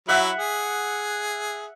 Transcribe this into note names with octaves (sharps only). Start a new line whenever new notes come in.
F#3 E4 E5 F#5
G#4